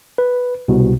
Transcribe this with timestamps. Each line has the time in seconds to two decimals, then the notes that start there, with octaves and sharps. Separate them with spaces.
0.18 B4
0.68 C2 B2